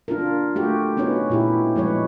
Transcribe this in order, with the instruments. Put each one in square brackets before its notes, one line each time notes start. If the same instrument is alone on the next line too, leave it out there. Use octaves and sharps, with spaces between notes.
[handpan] D4 F4 A#4
A3 F#4 G4
B3 C#4 D#4 F#4 B4 C#5
A#2 E4 G4
F3 G#3 B4 C#5